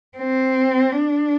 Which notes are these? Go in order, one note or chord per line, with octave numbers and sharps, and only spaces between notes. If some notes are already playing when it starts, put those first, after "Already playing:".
C4
D4